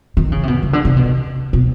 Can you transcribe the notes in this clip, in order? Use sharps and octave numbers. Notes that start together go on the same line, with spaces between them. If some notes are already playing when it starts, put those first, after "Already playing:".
D#3
C#3
C3
B2
C#3
D3
C3
B2
B2